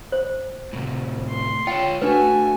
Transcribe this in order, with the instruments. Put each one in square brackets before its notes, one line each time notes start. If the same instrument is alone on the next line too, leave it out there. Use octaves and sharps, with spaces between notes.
[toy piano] C5
[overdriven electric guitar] A2 C3
[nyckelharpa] C6
[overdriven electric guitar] F4 C#5 [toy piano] G5
[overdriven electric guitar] A3 [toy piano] D4 B4 [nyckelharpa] F#4 G#5